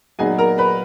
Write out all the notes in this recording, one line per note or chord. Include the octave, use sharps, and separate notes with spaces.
A#2 F#3 B3 D#4 G#4 G#5
A#4 A#5
B4 B5